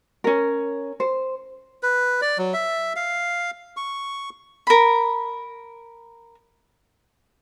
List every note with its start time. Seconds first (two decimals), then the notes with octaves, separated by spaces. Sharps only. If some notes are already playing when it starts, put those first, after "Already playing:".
0.24 C#4 A#4
1.00 C5
1.83 B4
2.22 D5
2.38 F#3
2.54 E5
2.96 F5
3.77 C#6
4.67 A#4 B5